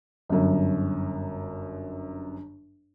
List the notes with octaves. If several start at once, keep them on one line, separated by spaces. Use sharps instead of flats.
G1 F#2